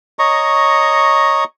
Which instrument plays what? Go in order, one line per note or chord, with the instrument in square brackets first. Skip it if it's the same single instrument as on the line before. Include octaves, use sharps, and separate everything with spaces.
[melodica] C#5 D#5 A#5 C#6